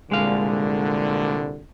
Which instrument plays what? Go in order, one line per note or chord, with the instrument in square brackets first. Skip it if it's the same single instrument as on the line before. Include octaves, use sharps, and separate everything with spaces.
[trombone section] C2 A#2 D3 [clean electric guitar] G#3 F5